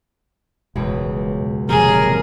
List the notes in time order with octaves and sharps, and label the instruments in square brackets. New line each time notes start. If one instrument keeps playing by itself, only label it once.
[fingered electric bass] E1 [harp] C#2 F#2 B2
[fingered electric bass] D#1 F2 C3 [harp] F#3 A#3 [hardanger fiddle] G#4 [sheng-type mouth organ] A#4